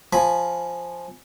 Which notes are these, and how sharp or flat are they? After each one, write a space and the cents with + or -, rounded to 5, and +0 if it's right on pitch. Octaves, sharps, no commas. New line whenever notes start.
F3 +0 G#5 +0 B5 +0